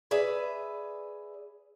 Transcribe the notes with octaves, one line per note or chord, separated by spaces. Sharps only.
G#4 B4 D5 E5